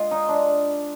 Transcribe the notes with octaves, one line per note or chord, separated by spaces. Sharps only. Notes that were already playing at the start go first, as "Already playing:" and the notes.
Already playing: G#3 F4
D#4
D4